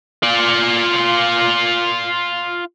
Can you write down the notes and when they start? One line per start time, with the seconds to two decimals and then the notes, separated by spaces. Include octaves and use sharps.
0.23 F4 D5